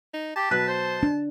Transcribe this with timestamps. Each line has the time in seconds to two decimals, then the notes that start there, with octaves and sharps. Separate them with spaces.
0.14 D#4
0.36 G4 A5
0.51 B2 F#3 B4 F#6
0.68 C5
1.03 D4